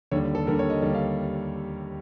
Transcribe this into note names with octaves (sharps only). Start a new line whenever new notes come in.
D#2 D3 G3 C#5
A4
D#2 D3 G3 A#4
C#5
D#5
D#2 D3 G3
F5